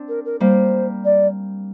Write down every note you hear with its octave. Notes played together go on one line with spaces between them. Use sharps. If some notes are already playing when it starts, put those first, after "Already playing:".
Already playing: C4 D4
A#4
A#4
G3 A#3 C5
D5